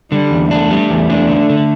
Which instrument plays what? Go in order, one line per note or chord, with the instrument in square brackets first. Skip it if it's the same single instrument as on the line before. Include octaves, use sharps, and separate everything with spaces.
[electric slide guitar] D3 [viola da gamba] G3
[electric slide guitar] E2
[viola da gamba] A3 [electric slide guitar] D4
[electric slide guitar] G3
E2
D4
D3
D3